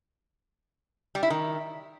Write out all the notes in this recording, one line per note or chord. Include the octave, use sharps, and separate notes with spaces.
G3
E4
D#3